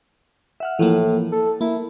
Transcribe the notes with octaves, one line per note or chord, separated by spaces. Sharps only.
E5 F#5 F6
A2 E3 F3 A#3
A4
A#3 E4